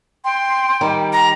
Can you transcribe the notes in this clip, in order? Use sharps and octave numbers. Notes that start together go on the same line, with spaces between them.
G5 C6
D#3 G3 G4
A#5